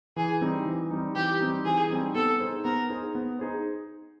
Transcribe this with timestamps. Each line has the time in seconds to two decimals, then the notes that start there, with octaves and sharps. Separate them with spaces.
0.16 E3 G#4
0.41 G3 C4 D#4
0.66 E3
0.91 G3 C4 D#4
1.15 E3 G4
1.40 G3 C4 D#4
1.65 E3 G#4
1.90 G3 C4 D#4
2.15 B3 A4
2.40 D#4 G#4 C5
2.64 B3 A#4
2.89 D#4 G#4 C5
3.15 B3
3.39 D#4 G#4 C5